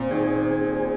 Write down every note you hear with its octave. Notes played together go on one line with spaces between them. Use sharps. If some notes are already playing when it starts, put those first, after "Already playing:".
Already playing: A#2 C4
D#3 G#4
C4
G#4